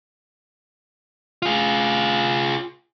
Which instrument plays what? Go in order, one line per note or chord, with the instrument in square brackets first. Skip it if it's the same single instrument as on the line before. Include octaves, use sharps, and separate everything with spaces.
[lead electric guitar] F4 G#4